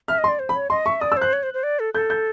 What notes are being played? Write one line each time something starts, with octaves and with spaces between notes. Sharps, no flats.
E5 F6
D#5
C6
D5
C5
B5
C#5
D#5 C6
E5 C#6
D5 D#6
E6
C5 F#6
C#5
C5
C5
D5
A4
A4 G6
G6